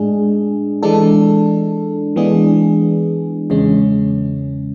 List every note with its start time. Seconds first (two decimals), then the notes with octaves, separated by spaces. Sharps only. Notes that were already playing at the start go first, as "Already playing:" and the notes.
Already playing: A2 G#3 D4 G#4
0.83 E3 G#3 D4 A4
2.16 E3 G#3 B3 D4 G#4
3.50 E2 C#3 G#3 C#4